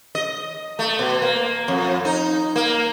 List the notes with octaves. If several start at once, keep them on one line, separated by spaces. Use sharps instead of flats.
D#5
A3
B2
A#3
F2
D#4
A#3